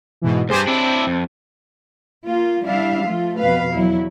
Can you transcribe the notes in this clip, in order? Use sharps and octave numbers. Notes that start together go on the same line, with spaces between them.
G#2 B2 E3
D2 G2 G4 G#4 C5
C4 D4 E4
F2
A#3 F4
G3 D4 E4 E5 F5
F3 A3 F4
F2 B2 B4 F5
E2 F#3 E4